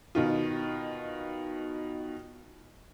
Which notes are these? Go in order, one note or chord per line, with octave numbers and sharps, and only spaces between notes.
B2 D#3 F4